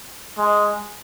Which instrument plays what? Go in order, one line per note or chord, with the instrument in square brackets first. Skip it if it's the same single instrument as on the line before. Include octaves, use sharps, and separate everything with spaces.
[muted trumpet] G#3